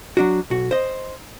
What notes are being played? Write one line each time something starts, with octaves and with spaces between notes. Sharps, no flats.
F#3 D4 F#4
B1 F#4
C5 D#5